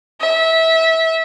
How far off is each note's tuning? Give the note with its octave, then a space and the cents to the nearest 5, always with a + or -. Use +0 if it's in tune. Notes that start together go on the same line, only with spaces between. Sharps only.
E5 -20